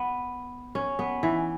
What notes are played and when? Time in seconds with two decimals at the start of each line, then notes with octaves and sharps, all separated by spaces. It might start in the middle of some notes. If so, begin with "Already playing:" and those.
Already playing: B3
0.75 C#4
0.99 B3
1.23 E3